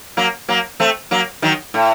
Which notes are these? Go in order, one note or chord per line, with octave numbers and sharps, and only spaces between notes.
F#3 A#3
F#3 A#3
A3 C4
F#3 A#3
D#3 F#3
A2